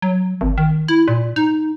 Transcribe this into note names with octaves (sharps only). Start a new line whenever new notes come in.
F#3
G#1
D#3
E4
A#2
D#4